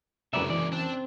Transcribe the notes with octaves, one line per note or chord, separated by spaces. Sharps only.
F#1 F#2 C3 G#3 B4 D5 E5 A#5
E3 D5
C4 D4 A5